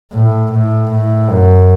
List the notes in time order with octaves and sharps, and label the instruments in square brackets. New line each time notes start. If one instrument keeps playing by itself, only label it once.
[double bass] A2
A2
A2
F#2